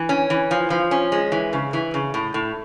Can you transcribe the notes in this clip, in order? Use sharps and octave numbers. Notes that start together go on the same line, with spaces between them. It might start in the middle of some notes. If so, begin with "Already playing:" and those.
Already playing: E3
C#4
E3
F3
F3
C#4
G#3
E3
C#3
E3
C#3
A2
A2